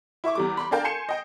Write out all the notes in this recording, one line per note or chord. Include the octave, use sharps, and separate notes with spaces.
E4 E5 C#6 D6
E2 G3 D6
B5 C6 D6
D4 G#4 A#4 F5 G5 A5
G#5 C6 G6 C7 C#7 E7
D#5 G5